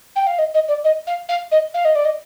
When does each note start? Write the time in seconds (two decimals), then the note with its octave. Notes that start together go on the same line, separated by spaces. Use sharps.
0.16 G5
0.27 F5
0.39 D#5
0.54 D#5
0.68 D5
0.84 D#5
1.07 F5
1.29 F5
1.52 D#5
1.74 F5
1.85 D#5
1.95 D5
2.05 D#5